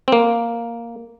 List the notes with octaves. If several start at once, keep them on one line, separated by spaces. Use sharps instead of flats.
C4
A#3